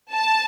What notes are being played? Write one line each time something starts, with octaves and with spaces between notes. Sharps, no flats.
A5